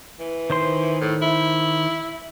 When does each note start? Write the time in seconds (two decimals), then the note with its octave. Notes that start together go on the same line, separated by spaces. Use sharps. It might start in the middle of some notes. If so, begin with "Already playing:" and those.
0.19 E3
0.50 D#3 C5 C6
1.01 A2
1.22 E4